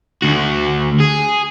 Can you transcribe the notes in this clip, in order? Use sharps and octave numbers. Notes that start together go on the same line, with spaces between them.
D2 F#4
G#4